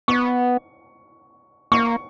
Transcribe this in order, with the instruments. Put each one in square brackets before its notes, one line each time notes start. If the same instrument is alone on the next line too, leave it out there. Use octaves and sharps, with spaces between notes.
[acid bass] B3 [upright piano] C#6
[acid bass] A#3 [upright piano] C#6